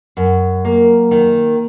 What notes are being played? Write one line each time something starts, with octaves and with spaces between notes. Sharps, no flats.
F#2
A#3
D#3